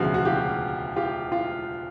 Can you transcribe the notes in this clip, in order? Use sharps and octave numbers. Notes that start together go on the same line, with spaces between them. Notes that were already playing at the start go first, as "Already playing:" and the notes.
Already playing: E1 D2 C#3 F3 F#4
F#4
F4 G4
F4 G4
F4